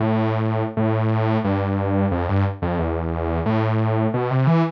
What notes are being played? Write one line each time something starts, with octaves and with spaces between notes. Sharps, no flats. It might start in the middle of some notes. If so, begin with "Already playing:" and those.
Already playing: A2
A2
G2
F2
G2
F2
E2
A2
B2
C3
E3